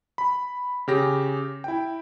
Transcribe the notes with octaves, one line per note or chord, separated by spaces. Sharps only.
B5
C#3 G4 A#6
E4 G5